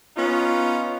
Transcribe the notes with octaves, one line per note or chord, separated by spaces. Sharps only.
B3 C#4 D#4 F4 F5